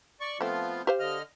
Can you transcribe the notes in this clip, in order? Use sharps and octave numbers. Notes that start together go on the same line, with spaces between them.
D5 C#6
F3 A3 B3 C4 F4
G4 C5 F5
D3 D#5 F6